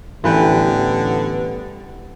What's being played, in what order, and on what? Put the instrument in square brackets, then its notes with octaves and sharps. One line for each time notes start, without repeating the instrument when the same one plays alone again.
[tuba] A1 [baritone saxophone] D3 [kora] E3 B4 G5 [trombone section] G3 B3